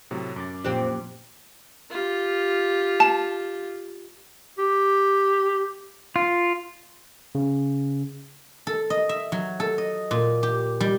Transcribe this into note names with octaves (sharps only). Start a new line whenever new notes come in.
A2 C3 F#3
F#2 D6 A6
F2 A#2 F3 C4 D4 G4
F4 G4
A5
G4
F4
C#3
A4
D#5
E5
F#3
A4
D#5
A#2
G4
G3